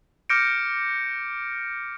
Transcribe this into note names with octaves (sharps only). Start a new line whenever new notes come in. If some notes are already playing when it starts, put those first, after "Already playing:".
D6 F6 G6 A#6 C#7 D7